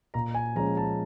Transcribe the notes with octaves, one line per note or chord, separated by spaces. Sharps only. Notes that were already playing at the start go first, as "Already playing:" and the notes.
A#2 A#5
G#5
F3 G#3 C#4 A#5
A5